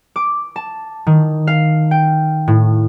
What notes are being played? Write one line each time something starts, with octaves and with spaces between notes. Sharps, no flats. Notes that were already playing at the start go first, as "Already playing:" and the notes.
D6
A5
D#3
F5
G5
A2